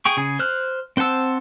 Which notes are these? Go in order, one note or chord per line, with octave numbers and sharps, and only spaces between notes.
G#4 G5 C#6
C#3 G#4
C5 F6 F#6
C4 C5 F#5 A5 E6